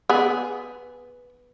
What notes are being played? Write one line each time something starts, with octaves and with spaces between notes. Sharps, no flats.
B3 G#4